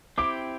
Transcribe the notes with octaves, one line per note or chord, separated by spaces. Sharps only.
C4 E4 G4 D6